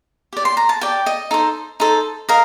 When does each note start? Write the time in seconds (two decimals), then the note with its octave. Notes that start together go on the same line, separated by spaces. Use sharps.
0.33 G4 D5
0.45 C6
0.57 A#5
0.69 A5
0.81 G4 D5 G5
1.06 D#5
1.31 D#4 A4 C5
1.80 D#4 A4 C5
2.29 A#4 D#5 F5